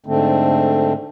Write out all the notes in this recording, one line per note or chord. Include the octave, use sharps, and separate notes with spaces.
G#2 D3 A3 C4